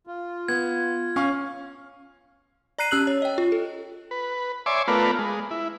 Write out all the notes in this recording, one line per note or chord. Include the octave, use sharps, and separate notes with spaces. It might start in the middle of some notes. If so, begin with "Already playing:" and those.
F4
B3 G#6
C#4 F5 C#6
D5 A#5 F#6 C7 D#7
C#4 G4 E6 F#6 F#7
C#5
D#5 G5
F4
A4
B4
C#5 D5 E5 G#5 C6 D6
A3 B3 F4 A#4 B4 D5
G#3
E4